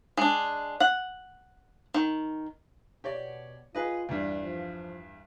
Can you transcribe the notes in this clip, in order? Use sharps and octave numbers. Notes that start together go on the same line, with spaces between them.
G#3 D4
F#5
D#3
B2 G4 C#5 D5
F4 G#4 B4 D#5
E2 G2 D5
F3